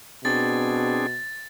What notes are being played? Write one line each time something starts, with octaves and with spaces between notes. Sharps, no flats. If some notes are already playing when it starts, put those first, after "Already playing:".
B2 C4 D4 G#4 A6